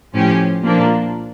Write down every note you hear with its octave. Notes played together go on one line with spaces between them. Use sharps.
A2 F3 C#4 G4
A#2 F3 A#3 D4